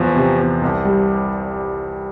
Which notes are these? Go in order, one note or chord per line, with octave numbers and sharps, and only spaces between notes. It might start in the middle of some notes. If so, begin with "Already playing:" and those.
Already playing: E2 F3
C3
E2
C2
G3